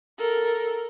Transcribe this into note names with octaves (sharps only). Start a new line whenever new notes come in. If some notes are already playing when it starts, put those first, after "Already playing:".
A4 A#4